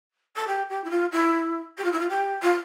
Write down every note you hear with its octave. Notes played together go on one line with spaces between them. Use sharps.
A4
G4
G4
E4
F4
E4
G4
F4
E4
F4
G4
F4